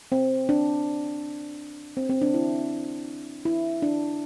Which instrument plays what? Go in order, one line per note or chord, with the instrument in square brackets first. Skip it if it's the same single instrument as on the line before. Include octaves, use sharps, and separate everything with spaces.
[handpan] C4
D4
C4
C4
D4
E4
E4
D4